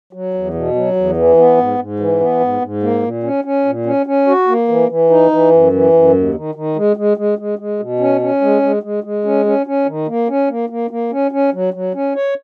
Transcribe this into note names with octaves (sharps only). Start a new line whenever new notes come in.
F#3
E2
B2
F#3
E2
E3
B3
G#2
G#2
E3
B3
G#2
G#2
A#3
A#2
C#4
C#4
A#2
C#4
C#4
F#4
A#3
E3
E3
D#4
E3
F#2
E3
F#2
D#2
D#3
D#3
G#3
G#3
G#3
G#3
G#3
B2
C#4
C#4
G#3
G#3
G#3
G#3
C#4
C#4
C#4
D#3
A#3
C#4
A#3
A#3
A#3
C#4
C#4
F#3
F#3
C#4
C#5